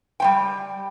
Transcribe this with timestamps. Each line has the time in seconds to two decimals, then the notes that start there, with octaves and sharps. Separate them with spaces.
0.20 G3 G#3 G5